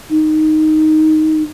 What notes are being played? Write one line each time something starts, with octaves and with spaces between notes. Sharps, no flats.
D#4